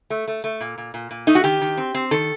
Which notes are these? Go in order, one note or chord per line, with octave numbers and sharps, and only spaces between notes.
A3
A3
A3
A#2
A#2
A#2
A#2
A3 D#4
F#4
D#3 G4
D#3
C4
C4
D#3 A4